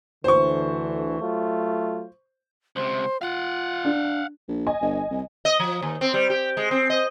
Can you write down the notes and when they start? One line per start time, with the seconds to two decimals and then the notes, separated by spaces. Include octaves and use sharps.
0.24 D2 D3 E3 C5 C#6
1.20 F#3 A3 F4
2.76 C#2 C3 C5
3.21 F4 F5 F#5
3.85 D4
4.48 A#1
4.67 D#5 G#5
4.81 G1
5.11 C2
5.45 D#5
5.60 F3
5.82 D#2
6.01 C4
6.14 G3
6.30 G4
6.57 G#3
6.71 C4
6.90 D#5